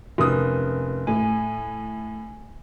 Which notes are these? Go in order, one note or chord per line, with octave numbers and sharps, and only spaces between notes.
F1 C#4 A#4 B4 D#6
A2 G#5